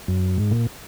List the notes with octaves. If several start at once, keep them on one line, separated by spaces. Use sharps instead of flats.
F#2
G#2
A#2